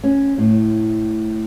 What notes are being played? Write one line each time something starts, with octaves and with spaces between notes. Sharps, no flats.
C#4
A2